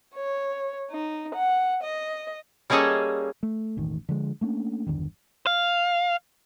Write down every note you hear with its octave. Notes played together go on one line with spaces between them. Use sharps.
C#5
D#4
F#5
D#5
G3 A#3 C#4 G#4 A4 D#5
A3
E1 A1 D#3
D3 F3 G#3
A3 A#3 C#4 D4
G1 E2 D3 D#3
F5